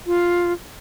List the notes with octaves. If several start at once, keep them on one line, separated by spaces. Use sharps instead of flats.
F4